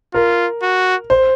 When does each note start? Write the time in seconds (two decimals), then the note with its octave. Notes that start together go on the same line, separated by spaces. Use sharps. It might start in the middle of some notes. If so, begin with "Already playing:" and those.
0.14 F4 A#4
0.62 F#4
1.10 C5